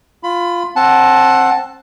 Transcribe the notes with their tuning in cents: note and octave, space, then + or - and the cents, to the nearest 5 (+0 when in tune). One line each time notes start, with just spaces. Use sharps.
F4 +0 B5 +25
C4 +20 F#5 +0 A5 -10